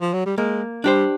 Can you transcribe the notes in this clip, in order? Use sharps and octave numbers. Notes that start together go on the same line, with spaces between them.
F3
F#3
G3
G#3 A#3
G3 D4 G4 C5